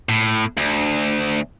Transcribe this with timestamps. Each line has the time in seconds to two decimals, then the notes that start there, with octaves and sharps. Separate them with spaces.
0.09 A2
0.57 D2